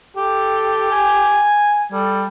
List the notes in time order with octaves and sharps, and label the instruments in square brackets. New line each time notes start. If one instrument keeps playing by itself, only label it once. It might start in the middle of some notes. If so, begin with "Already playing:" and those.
[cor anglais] G4 [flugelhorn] A4
[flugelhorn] G#5
[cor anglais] G3 [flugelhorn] A4